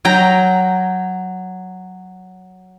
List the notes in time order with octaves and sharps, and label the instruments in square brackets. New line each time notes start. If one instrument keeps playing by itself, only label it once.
[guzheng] F#3 G5 A#5